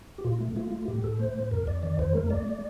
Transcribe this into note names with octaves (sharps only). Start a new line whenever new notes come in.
G4
A#2 F4
A3
A3 F4
A3
A2 G4
A2 A4
A3 C5
A2
F2 A#4
F2 D5
D#3 D5
F2 C5
A3 A#4
A3 D5
A3